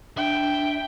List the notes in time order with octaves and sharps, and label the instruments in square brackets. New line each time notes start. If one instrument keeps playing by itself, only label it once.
[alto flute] D4 [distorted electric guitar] E5 [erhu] G5